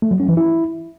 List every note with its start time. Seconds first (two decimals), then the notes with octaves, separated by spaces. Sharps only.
0.02 A3
0.11 F#3
0.20 C#4
0.28 E3
0.37 E4